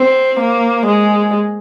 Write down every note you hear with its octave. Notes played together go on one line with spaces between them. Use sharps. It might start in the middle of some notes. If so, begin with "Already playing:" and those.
Already playing: C4
A#3
G#3